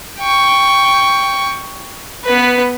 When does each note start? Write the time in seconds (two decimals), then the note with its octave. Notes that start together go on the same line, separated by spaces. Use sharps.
0.19 G5 C#6
2.24 B3 B4